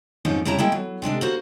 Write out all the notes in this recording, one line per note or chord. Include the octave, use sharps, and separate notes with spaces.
F2 G#2 F3 B3 C#4 D#4
F2 C#3 E4 G4 A5 A#5
G#3 A#3 E4 A4 G5
F#3
C3 G#3 D4 A4
A#3 F#4 C5